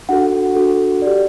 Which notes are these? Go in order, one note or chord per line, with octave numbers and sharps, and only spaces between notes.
D4 F#4 A4 F#5
D4 F#4 A4
G4 D5